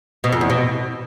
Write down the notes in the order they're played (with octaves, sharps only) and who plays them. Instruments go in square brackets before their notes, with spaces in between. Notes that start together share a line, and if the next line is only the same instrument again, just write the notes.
[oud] B2
F2
E2
B2